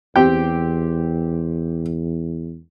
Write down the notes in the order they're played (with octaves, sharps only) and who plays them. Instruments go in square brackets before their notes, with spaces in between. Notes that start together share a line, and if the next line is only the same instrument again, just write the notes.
[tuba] E2 [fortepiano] C4 G4 G5